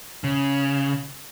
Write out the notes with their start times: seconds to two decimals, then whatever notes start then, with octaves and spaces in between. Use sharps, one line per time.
0.24 C#3